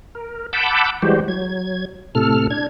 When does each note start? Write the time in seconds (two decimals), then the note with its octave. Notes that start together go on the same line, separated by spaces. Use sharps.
0.15 A#4
0.53 F#5 A5 B5 D6 E6 G6
1.02 E3 G3 G#3 F#4 G4 C5
1.28 F#3 G#6
2.15 A2 C3 A4 F6
2.51 D4 G#6